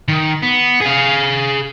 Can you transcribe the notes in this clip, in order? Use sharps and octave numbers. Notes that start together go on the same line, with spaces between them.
D#3
B3
G#4 F5